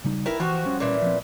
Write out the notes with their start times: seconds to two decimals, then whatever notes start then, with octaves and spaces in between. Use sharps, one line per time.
0.04 C#3 G3 D#4
0.26 E4 A#4 B4 G5
0.40 E3 F3 F#4 G4
0.65 G3 C#4 C#5
0.80 A#2 E3
1.02 F3 C4